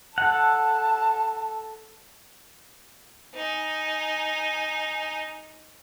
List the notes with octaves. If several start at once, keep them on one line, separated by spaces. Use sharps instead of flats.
A4 F#5 A5
D#4 G#5